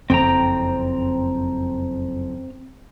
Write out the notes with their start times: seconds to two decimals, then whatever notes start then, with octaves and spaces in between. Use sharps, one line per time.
0.10 F#1 F2 C4 G5 A#5